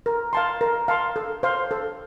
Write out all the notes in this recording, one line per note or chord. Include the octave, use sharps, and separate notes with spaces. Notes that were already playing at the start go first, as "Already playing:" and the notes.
A#4
F5 A5 C6
A#4
F5 A5 C6
A4
C5 F5 C6
A4